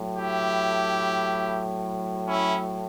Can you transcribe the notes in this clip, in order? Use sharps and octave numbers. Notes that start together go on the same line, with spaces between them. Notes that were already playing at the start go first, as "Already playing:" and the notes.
Already playing: A2 F#3
E4 G4
C#4 E4